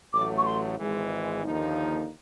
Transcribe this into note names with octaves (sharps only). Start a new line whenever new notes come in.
A1 A2 F#3 A3 D6
C#6
C6
G#1 G#2 E3 G#3
D#2 D3 F3 A#3 D#4